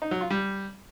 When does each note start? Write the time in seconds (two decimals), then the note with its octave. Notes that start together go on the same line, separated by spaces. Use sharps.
0.02 D#4
0.11 F#3
0.21 F4
0.30 G3